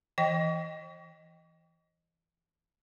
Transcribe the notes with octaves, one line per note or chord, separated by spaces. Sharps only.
E3 D#5 G5